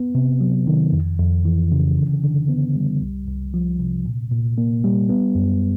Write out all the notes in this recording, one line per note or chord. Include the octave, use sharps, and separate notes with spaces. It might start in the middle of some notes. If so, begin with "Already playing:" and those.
Already playing: B3
C3
F#3
D#3
F2
F2
E3
C#3
D3
D3
B3
G3
C2
C2
F3
C3
A#2
A#2
A#3
G3
B3
F#2